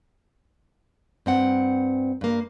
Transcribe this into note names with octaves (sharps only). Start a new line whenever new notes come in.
G2 C4 F#5
G2 A#3